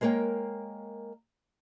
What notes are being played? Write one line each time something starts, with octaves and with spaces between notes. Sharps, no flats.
G#3 A#3 A#4 C#5 G5